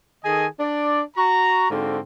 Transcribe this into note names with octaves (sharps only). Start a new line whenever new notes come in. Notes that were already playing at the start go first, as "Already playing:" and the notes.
D#3 G#4 A4 D#5 G#5
D4 D5
F#4 A#5
G#2 D3 C4 F#4 F5